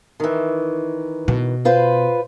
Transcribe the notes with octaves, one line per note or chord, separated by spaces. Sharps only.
D#3 E3
B2
F4 B4 C5